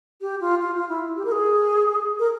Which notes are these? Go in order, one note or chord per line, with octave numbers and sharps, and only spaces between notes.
G4
F4
F4
F4
E4
G4
A#4
G#4
A#4